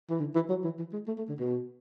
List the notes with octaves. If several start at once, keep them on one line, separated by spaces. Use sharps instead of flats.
E3
D3
E3
F#3
E3
E3
G#3
A3
A3
D3
B2